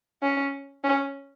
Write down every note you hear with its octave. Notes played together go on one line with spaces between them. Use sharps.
C#4
C#4